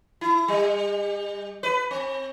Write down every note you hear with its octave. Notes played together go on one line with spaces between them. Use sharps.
E4
G3
B4
C4